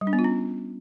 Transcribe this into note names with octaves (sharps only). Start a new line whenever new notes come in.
G3
D4
B3
F4
C#4